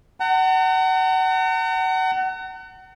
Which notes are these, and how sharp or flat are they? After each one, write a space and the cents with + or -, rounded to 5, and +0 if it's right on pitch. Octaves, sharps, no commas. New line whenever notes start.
F#5 +30 A#5 -45